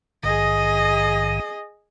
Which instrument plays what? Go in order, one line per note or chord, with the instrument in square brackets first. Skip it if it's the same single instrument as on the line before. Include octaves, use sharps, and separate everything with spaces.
[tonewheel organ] A#1 G#2 D#3 [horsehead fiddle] G#4 D#5